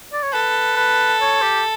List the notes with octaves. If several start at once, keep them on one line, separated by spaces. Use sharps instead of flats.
D5
C#5
A4 B4
B4
C#5
G4